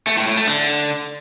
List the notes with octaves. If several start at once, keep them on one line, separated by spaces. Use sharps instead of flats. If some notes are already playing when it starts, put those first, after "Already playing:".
A3
A2
A2
A3
D3